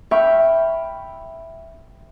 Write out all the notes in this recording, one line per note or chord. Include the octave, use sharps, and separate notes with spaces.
E5 G5 B5 C#6 F6